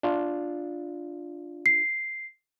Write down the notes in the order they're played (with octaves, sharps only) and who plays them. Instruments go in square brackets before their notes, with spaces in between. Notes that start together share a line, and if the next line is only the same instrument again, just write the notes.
[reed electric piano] D4 F4
[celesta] C7